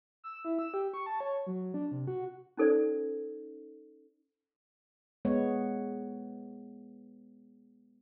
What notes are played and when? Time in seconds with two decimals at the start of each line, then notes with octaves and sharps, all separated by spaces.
0.24 E6
0.45 E4
0.59 E6
0.74 G4
0.94 C#6
1.06 A5
1.20 C#5
1.47 F#3
1.74 D4
1.92 C3
2.07 F#4
2.57 C#4 D#4 A4 C5 D5
5.25 G#3 B3 C#5